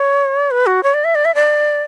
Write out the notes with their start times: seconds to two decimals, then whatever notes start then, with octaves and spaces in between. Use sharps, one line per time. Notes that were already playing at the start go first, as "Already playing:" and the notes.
Already playing: C#5
0.51 B4
0.66 F#4
0.83 C#5
0.94 D5
1.04 E5
1.15 D5
1.25 E5
1.35 D5